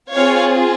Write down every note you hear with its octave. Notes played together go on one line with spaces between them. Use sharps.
C4 F4 G#4 C#5 F5